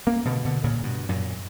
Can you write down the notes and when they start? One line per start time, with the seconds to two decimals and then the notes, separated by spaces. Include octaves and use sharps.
0.07 A#3 C#4
0.25 B2 D3
0.45 B2 D3
0.64 A#2 C#3
0.83 G2 B2
1.09 F#2 A#2